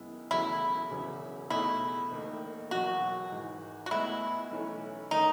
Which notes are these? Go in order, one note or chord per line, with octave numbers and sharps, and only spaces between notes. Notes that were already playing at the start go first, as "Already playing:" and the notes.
Already playing: F#2 D#3 G#3 B3 E4
E1 E2 C#3 F#3 A3 E4
E1 E2 C#3 F#3 C#4
B2 A3 D#4 E4 G#4
E1 D#2 D#3 A3
F#1 E2 B2 F#3 F#4
G#1 G#2 E3
F#4
A2 G#3 B3 E4
B1 A2 E3 A3 C#4
D#3 A3 C#4 D#4